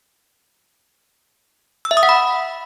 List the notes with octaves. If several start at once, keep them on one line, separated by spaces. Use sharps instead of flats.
E6
E5
D#6
F#5
B5